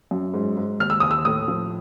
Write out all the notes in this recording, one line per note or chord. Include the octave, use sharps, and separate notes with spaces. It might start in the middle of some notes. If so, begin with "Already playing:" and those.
F#2
G#2
G#2
D#2 F6
E6
D#2 D#6
E6
A2 D#6
F3